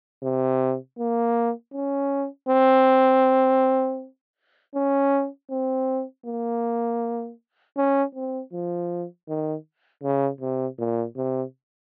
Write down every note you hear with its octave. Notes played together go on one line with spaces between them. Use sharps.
C3
A#3
C#4
C4
C#4
C4
A#3
C#4
C4
F3
D#3
C#3
C3
A#2
C3